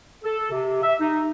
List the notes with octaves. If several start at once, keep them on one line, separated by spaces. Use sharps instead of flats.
A4
C3
E5
D#4